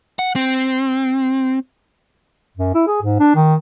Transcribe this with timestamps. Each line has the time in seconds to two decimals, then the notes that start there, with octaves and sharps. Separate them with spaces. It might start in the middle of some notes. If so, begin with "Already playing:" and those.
0.19 F#5
0.36 C4
2.57 F#2
2.75 E4
2.87 G#4
3.02 G#2
3.20 D4
3.35 D#3